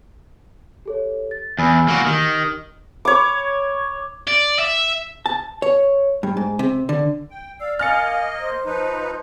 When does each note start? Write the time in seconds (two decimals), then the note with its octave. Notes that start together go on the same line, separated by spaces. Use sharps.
0.85 G4 A4 C#5
1.31 A6
1.59 E2 G#5 B5 E6
1.88 A#3 F#4
2.06 D#3 G4
3.05 C#5 D6
4.28 D5
4.59 E5
5.26 A5
5.62 C#5
6.23 G2
6.37 G#2
6.59 C3
6.89 D3
7.31 G5
7.60 D5 F5 E6
7.79 A#3 D#5 F5 G#5 F6 A6 C#7
8.39 C5
8.66 F3 D#4 B4